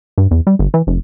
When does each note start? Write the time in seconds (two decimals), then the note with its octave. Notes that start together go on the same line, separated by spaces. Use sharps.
0.18 G2
0.31 E2
0.47 G3
0.59 G1
0.74 E3
0.87 F1